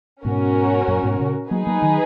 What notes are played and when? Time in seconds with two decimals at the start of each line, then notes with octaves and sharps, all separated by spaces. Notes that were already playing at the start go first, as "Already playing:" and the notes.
0.25 G#2 B2 C#4 F#4 A#4
0.88 F#2 A#2
1.03 G#2 B2
1.20 A#2 C#3
1.51 F#3 A#3 D#4 G#4 B4
1.67 F#3 A#3
1.82 D#3 F#3